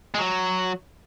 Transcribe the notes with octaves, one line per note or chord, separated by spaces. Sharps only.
G#3
F#3